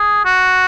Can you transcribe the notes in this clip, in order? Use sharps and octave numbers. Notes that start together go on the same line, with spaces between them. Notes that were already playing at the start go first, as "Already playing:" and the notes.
Already playing: G#4
F#4